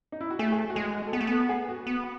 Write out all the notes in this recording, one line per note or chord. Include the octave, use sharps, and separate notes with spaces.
D#4
E4
F#4
A3 G#4
G#4
A4
F#4
G#3 G#4
F#4
A4
B3 G#4
A3
B3 A4
G#4
F#4
B3